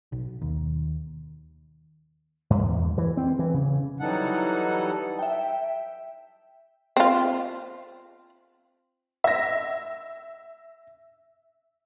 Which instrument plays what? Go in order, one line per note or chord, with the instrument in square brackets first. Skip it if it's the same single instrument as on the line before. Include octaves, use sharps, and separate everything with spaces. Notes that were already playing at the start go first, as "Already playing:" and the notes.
[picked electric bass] B1
D#2
[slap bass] G2
E2
E3
C4
E3
C#3
[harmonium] E3 F#3 G3 D#4 A4 F#5
[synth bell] E5 G5
[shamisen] C4 F4
[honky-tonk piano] E5 A#6